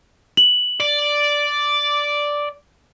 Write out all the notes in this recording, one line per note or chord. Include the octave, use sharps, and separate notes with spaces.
F#7
D5